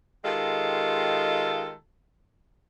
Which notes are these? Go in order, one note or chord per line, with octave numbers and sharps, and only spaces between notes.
D#3 G#3 F4 G4 A4